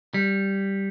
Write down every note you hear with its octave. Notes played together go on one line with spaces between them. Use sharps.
G3